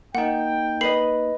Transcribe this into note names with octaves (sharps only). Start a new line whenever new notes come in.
A#3 D#4 F#5 G5
B4 D#5 C7 F#7